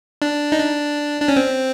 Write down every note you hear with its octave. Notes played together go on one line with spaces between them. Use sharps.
D4
D#4
D4
D4
C#4
C4